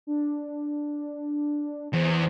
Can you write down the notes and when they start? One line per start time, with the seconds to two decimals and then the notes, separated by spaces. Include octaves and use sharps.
0.07 D4
1.93 E2 C5